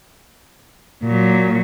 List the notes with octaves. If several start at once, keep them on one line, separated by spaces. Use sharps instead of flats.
A#2 F#3